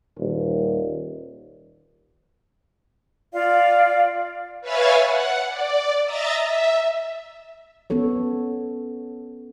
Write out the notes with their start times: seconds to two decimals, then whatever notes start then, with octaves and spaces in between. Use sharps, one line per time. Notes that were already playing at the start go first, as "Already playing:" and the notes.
0.19 D#1
3.33 F4 D5 F5
4.61 B4 C#5 E5 F5 G#5 A6
5.01 F#5
5.49 D5
6.04 D#5 E5 A#5 A6
6.43 E5
7.90 B3 C#4 A4 C#5